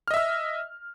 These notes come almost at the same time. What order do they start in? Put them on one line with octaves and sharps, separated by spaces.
F6 D#5 E5 E6